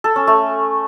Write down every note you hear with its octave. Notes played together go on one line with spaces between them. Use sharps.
A4
C#4
A3